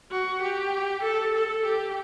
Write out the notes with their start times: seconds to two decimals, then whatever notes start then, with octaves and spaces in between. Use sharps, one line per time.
0.11 F#4
0.42 G4
1.03 A4
1.35 A4
1.65 G4